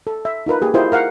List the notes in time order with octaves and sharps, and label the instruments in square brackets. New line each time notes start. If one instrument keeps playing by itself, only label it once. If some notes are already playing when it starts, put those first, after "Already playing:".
[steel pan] A4
E5
D#4 F4 A#4 B4
A#3 G4 G#4
E4 F4 G4 A#4 C5 D#5
A#4 F5 F#5